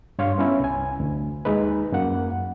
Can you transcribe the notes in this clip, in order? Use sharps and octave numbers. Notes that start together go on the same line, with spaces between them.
G2 C#5 F5 C6
B3 C#4 E4
C2 G#5
D2
D#2 G#3 D#4 B4
F#2 A#3 F#5